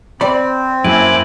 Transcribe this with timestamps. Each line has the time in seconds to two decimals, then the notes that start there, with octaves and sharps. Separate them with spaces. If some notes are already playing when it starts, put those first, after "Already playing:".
0.21 C4 D5 B5
0.84 F#2 A#3 E4 G#5 D6 F#6